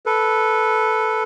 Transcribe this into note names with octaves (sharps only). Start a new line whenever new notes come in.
A4 B4